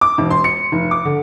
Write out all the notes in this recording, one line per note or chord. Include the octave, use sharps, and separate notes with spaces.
D6
E1
C6
C#7
F1
D6
D3